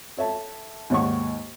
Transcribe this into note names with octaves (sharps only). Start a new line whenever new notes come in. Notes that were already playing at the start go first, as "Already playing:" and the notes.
A4 C#5 E5 A5
D#2 G#2 C#5 F#5 C#6